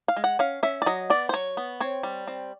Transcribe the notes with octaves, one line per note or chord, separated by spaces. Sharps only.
F5
G#3
F#5
C#4 F5
C#4 E5
D5
F#3 D#5
B3 D5
C5
F#3 C#5
B3
C4 C#5
G3
C4